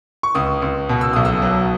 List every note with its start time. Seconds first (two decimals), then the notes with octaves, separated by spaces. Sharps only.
0.23 C#6
0.35 C#2 D#6
0.62 C#2
0.89 B2
1.01 E6
1.13 B1 D#6
1.25 E6
1.42 F#3